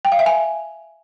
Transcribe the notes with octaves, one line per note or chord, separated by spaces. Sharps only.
G5
F5
E5
G#5